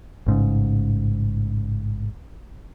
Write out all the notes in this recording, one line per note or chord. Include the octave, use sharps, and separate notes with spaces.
A1 G#2 C#3